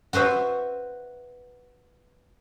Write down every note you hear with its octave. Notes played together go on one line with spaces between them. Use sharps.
F#4 B4 C5 E5